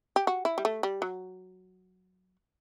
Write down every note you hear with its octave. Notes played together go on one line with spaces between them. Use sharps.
G4
F#4
E4
G3
A3
G3
F#3